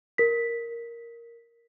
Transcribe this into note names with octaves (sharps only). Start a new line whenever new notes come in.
A#4 B6